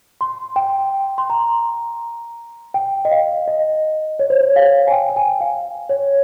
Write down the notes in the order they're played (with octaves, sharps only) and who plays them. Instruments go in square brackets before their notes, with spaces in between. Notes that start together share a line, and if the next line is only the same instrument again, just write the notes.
[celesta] C6
G5
C6
A#5
G5
D#5
F5
D#5
C#5
C5
C#5
F5
G#5
G5
G5
G#5
F5
C#5